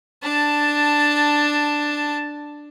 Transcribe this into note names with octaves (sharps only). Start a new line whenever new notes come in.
D4 A5